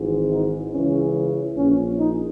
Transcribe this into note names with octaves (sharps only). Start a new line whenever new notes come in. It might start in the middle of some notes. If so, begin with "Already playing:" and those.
Already playing: G#1 G#2 E3
D#4
C#2 C#3 E3 C#4
A#1 A#2 C#4
D#4